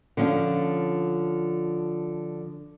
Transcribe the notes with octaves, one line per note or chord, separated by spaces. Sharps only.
D3 F3 C#4